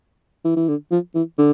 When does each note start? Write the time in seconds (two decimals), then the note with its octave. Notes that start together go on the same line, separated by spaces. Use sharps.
0.45 E3
0.56 E3
0.68 D3
0.91 F3
1.15 E3
1.38 D3